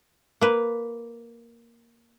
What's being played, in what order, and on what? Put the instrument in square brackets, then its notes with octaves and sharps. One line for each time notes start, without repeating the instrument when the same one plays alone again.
[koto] A#3 B4